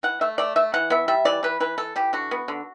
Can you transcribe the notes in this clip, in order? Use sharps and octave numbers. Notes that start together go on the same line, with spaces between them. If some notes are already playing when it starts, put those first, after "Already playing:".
E3 F#5
A3 E5
A3 D5
A3 E5
E3 F#5
B3 E5
G3 E5
E3 D5
E3 B4
E3 B4
E3 A4
E3 G4
D3 F#4
B3
D3